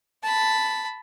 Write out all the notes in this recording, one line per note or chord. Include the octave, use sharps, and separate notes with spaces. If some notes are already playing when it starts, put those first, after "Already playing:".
A5 B5